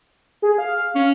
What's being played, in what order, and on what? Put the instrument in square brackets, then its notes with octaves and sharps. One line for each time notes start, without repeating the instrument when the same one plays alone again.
[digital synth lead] G#4
F5
[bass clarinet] C#4